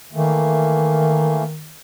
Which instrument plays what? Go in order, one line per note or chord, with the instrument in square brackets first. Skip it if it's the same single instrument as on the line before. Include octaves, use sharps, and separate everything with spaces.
[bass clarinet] D#3 [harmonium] E3 A3 A#3